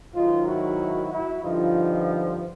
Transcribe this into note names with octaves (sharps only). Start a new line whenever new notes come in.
G#2 D#3 F#3 D#4 F4
E4 F#4
E4 F#4
G2 D3 F3 D#4 F4